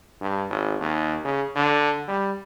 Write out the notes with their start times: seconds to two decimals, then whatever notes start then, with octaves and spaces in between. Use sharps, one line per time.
0.21 G2
0.50 G#1
0.80 D#2
1.24 C#3
1.56 D3
2.08 G3